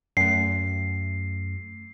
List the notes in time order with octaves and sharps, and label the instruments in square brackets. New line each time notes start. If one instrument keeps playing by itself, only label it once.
[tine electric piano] F#2 A3 [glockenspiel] C7